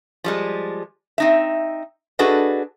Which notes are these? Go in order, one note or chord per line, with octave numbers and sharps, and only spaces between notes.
F3 G3 G#3
C4 D#4 E5
D4 F#4 G#4 A4 B4 D#5